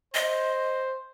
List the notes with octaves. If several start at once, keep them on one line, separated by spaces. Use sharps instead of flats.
C5 D#5